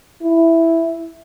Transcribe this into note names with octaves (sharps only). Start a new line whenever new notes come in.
E4